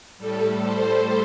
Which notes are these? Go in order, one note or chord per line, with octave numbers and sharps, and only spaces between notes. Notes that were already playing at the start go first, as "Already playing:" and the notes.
A2 G3 A4
C5